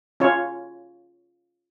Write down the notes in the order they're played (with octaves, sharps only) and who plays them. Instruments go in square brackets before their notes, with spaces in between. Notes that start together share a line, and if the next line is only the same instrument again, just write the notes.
[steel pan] C#4 F4 C#5